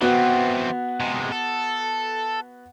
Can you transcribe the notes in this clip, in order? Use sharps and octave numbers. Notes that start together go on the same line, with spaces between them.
E3 B3 C4 F#4
C3 G#3
A4